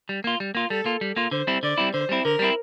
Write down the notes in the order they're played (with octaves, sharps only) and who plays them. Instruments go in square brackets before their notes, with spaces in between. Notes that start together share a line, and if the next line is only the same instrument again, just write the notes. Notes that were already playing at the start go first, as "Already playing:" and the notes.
[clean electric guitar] G3
A#3 F4
G3
A#3 F4
[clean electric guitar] G3 [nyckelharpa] A4
[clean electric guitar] A#3 F4
G3
A#3 F4
[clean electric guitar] D3 [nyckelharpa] C5
[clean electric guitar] G3 C4 E4
[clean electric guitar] D3 [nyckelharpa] D5
[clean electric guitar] G3 C4 E4
[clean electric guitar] D3 [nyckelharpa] C5
[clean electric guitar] G3 C4 E4
[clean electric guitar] D3 [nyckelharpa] A#4
[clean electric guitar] G3 C4 E4